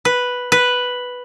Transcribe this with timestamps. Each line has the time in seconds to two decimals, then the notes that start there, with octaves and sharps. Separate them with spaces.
0.05 B4
0.52 B4